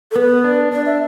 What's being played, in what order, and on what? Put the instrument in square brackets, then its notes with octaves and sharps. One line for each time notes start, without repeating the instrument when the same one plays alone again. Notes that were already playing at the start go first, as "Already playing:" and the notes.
[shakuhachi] A4
[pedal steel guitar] B3 [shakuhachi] B4
[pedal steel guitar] D4
[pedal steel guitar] D4 [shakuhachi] D5
[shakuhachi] E5